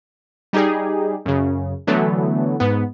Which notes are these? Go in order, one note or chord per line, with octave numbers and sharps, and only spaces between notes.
G3 D#4 G4 G#4
F#2 C#3
D3 E3 F#3 A3 B3
G#2 B3